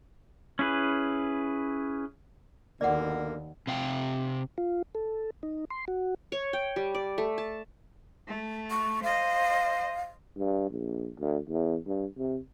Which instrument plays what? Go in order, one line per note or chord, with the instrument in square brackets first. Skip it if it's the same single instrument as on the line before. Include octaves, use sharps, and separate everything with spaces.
[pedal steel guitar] C#4 E4 G#4 B4
[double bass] D#2 [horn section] B2 D3 A#3 [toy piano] D5 F#5
[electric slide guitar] C3 F5 G5
[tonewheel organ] F4
A4
D#4
C6
F#4
[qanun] C#5
G5
G3
D5
A3
A5
[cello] A3
[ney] C#6
[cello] C5 D#5 [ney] F5
[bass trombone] G2
A#1
D2
E2
G2
C3